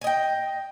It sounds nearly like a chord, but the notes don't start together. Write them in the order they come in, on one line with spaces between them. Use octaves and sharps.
G#5 D#5 G5